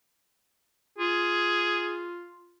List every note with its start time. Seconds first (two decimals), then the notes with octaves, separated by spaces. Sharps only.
0.98 F4 G#4